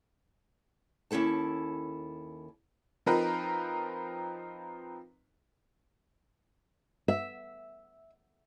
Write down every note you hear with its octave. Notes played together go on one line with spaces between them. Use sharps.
D#2 C#4 E4 A4 A5
F3 C4 D#4 A#4 B4
E5